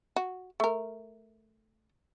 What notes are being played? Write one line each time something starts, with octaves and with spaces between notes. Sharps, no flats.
F#4
A3 A#4